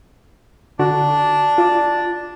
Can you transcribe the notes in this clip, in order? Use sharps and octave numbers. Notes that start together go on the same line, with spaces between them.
D3 D4 F#4
F4 D5